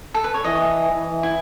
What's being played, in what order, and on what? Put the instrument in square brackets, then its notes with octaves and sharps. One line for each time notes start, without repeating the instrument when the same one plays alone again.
[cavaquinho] A4
B4
C#5
[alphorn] E3 [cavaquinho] D#5
[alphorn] E3
[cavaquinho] E4